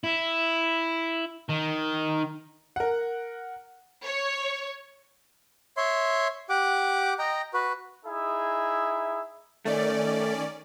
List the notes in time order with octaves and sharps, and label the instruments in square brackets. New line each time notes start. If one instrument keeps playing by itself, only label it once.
[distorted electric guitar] E4
D#3
[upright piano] A#4 F#5
[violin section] C#5
[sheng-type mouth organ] C#5 E5 C6
G4 F#5 D6
D#5 G5 A#5
F#4 B4
[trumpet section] D#4 E4 G#4 E5
[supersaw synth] D#3 C#4 D5 [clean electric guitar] A3